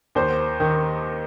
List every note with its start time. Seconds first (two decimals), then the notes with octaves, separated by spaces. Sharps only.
0.15 D#2 C5
0.60 D#3